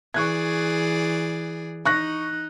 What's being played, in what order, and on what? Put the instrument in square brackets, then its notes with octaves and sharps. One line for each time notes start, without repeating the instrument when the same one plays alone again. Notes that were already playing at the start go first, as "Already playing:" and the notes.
[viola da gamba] E3 G#4 D5 [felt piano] C#6 F#6 G#6
[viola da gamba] D#4 [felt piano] C#6 F#6 A#6